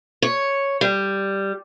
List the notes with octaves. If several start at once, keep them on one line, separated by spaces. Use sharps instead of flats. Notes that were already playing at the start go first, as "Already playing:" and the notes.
C#5
G3